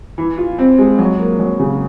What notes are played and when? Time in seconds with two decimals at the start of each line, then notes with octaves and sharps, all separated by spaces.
0.18 E3
0.38 F4
0.59 C4
0.78 G#3
0.99 F#3
1.19 A#3
1.39 F#3
1.59 C#3